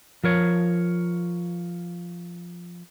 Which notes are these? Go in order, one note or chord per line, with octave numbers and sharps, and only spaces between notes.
F3 A#4 C#5